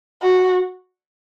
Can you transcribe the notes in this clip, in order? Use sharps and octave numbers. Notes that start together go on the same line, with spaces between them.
F#4